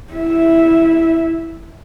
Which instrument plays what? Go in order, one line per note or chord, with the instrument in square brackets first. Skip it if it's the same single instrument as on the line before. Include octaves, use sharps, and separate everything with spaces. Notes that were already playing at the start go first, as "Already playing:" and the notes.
[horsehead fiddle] E4 E5